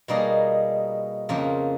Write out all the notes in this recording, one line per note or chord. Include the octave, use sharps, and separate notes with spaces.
B2 G3 A#3 D#4 G#4
F2 C#3 F3 A#3